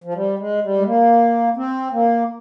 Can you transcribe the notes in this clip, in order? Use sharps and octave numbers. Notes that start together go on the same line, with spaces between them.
F3
G3
G#3
G3
G#3
A#3
C4
A#3